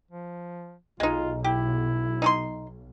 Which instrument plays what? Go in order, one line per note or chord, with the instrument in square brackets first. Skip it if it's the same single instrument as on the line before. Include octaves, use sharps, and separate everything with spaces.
[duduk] F3
[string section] B1 [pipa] G#3 D#4 [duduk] F4
[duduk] E4 [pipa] G4
[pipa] D#4 A4 C6